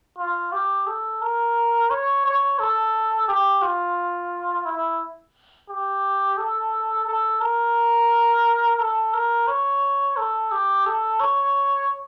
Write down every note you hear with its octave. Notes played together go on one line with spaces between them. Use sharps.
F4
G4
A4
A#4
C#5
C#5
A4
G4
F4
E4
G4
A4
A4
A#4
A4
A#4
C#5
A4
G4
A4
C#5